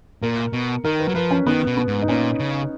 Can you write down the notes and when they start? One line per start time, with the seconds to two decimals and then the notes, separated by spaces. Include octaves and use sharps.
0.22 A#2 A#4
0.53 B2
0.84 D#3 A#4
1.00 B4
1.08 F#3
1.15 F3 B4
1.31 C#4
1.47 D#3 B3
1.67 B2
1.77 B3
1.88 G#2
2.02 D#4
2.08 A#2 C#4
2.40 C#3